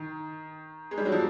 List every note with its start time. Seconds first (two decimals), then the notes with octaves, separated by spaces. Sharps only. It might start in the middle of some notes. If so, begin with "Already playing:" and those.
Already playing: D#3
0.91 G#3
0.98 G3
1.05 F#3
1.12 F3